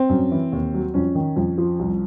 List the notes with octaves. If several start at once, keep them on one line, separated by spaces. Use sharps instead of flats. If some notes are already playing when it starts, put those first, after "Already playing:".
Already playing: C4
F#2
E3
D#2
F#3
F2 C#4
D#3
F2
F3
C2